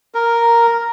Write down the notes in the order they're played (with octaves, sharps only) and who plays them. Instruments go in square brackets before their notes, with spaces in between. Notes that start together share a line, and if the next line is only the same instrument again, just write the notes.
[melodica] A#4